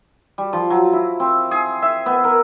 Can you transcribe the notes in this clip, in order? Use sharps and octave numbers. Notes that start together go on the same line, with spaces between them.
G3
F3
F#3
E4
C4
G#4
E5
B3
A#4